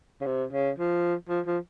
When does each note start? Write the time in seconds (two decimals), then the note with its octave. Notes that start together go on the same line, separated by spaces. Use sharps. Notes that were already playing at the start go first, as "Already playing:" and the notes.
0.21 C#3
0.26 C3
0.52 C#3
0.78 F3
1.29 F3
1.46 F3